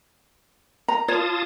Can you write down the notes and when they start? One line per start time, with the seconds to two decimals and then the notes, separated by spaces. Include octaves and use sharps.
0.88 A#5
1.08 F4 C#5 A5 D#6